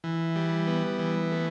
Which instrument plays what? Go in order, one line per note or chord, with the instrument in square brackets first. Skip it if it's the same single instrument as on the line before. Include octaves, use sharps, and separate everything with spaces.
[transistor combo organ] E3
G3
B3
E3
A3